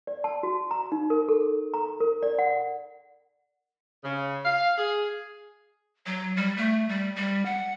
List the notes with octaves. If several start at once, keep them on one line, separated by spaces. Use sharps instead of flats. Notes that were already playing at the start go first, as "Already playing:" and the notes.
D5
A5
F#4
A#5
D#4
A#4
A4
A#5
A#4
D5
F#5
C#3
F5
G#4
F#3
G3
A3
G3
G3
F#5